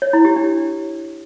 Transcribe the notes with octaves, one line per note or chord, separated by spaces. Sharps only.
C#5
E4
G4
D4